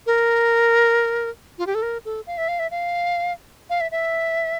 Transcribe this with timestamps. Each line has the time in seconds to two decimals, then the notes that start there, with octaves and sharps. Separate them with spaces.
0.06 A#4
1.58 F4
1.67 G4
1.75 A4
1.82 A#4
2.05 A4
2.27 F5
2.37 E5
2.48 F5
2.59 E5
2.71 F5
3.70 F5
3.81 E5
3.91 E5